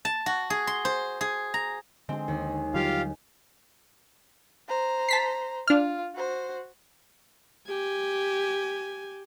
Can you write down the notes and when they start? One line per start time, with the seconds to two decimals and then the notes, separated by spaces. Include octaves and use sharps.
0.05 A5
0.26 F#4
0.50 G#4
0.67 C6
0.85 C5
1.21 G#4
1.54 A#5
2.09 D3 G#3 C4 G#4
2.28 D#2
2.74 D3 F#3 G3 F4 G4 F5
4.69 C5 A#5
5.09 A5 B6 C7
5.68 D4 F4 F6
6.15 F#4 C5
7.69 G4 G#5